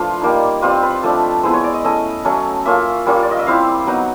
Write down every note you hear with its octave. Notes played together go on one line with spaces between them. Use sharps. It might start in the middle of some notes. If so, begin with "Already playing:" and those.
Already playing: F3 A3 D4 F4 B4
G3 A#3 D#4
G3 C4 F4 B4
B4
F3 A3 D4
G#3 B3 E4 C5
C#5
D5
D#5
A3 C#4 E4 D#5
F#3 A3 C#4
A#3 C#4 F4 E5
G3 A#3 C#4 F4
D5
D#5
E5
G3 C4 E4 F5
F#3 B3 D#4 F#5